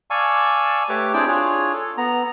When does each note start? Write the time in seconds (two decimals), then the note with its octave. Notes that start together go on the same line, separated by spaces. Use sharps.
0.10 D5 F5 G#5 A5 C#6 E6
0.89 A3 G4 A4 B4 C#5 D6
1.13 C4 D4 E4 G#4 G5 A5
1.27 D4 F4 G#4 C#5
1.73 A4
1.97 B3 A#5